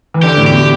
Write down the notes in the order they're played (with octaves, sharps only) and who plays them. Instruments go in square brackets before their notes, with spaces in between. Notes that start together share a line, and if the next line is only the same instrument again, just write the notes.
[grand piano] E3
[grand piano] D3 [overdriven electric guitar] G4
[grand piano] A2
[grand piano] B2 [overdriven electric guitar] G4